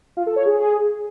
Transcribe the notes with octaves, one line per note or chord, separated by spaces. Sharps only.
F4
A4
C#5
G#4